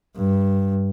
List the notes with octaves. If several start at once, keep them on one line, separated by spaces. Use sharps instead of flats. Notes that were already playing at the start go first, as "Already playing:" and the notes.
G2